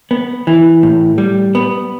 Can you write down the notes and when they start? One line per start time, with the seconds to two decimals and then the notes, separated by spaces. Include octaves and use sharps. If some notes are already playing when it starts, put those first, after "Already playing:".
0.11 B3
0.47 E3
0.83 A2
1.18 G3
1.55 B3